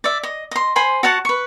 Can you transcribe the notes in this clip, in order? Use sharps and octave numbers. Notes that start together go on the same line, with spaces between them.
D5 E5
D#5
D#5 C6
C5 G#5 B5 C6
F#4 C#5 F#5 A5
B4 C#6